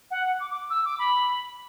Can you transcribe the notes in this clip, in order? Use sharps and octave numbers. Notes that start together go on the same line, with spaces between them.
F#5
D6
D6
E6
D6
B5